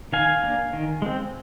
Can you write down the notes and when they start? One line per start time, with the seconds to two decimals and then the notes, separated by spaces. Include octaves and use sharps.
0.13 D#3 F5 G#5
0.43 A#3 D4
0.73 D#3
1.02 G#3 C4